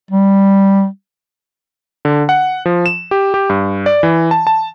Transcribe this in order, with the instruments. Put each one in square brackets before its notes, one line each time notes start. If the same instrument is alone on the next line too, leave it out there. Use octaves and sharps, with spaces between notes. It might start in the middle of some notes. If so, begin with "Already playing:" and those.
[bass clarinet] G3
[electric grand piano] D3
F#5
F3
E7
G4
G4
G2
D5
E3
A5
A5